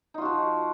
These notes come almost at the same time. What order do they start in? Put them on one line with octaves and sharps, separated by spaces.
D#4 F4 F#4 F3